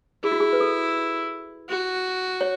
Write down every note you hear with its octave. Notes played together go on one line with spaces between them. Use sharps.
E4 G#4
F#4
G#4
B4
A4
F#4
C#5